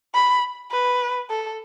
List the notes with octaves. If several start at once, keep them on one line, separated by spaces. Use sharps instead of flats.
B5
B4
A4